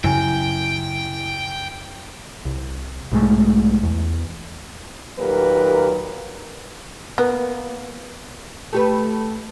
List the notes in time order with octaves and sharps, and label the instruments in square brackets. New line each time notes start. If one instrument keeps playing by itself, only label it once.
[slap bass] F#2 C#3 F#3 [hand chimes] E4 G#5 [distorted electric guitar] G5
[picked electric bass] C2
B1 G#2 G#3 A3
E2
[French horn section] D#2 A#2 F#3 G4 A#4 B4
[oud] A#3 [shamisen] B3
[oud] A3 G4 B4